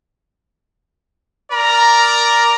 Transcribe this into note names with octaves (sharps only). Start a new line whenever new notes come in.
A#4 D5 A#5